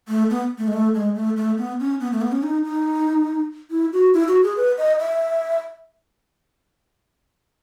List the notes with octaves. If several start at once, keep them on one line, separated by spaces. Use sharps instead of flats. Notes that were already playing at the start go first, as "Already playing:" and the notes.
A3
B3
A3
G#3
A3
G#3
A3
A3
B3
C#4
B3
A3
B3
C#4
D#4
D#4
E4
F#4
E4
F#4
G#4
B4
D#5
E5